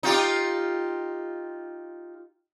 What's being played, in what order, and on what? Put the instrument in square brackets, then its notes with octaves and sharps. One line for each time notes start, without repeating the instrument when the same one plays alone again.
[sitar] D#4 F4 G4